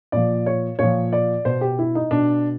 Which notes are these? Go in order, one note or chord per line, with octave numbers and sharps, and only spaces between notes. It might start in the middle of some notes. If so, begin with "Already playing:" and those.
A#2 F3 D5
C#5
A#2 F3 C#5
D5
B2 C5
G4
E4
D#4
B2 D4